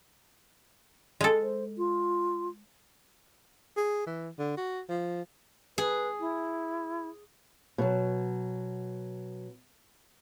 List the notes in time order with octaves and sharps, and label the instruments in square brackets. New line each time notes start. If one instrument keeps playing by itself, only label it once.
[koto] G#3 A4
[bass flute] C5
F4
[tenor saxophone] G#4
E3
D3
F#4
F3
[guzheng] G#4 [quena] B4
[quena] E4
[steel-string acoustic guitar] B2 F#3